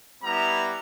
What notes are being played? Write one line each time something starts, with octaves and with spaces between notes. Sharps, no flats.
G3 B3 E4 A#5